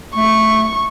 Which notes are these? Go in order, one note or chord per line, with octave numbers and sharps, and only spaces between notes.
A3 C#6